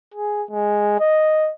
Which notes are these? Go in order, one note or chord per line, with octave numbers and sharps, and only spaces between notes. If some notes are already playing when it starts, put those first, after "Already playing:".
G#4
G#3
D#5